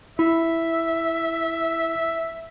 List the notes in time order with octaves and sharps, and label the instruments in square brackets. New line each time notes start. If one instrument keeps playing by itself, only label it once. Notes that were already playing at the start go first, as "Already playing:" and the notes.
[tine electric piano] E4 [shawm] E5